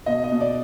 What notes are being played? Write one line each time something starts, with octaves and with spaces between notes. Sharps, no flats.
B2 D#5
D#5
B2
D5